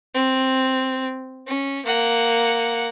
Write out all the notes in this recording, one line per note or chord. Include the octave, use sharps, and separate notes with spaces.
C4
C#4
A#3 F#5